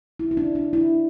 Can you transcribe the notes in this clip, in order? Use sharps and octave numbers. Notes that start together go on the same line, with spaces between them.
E4
E4
D4
D4
E4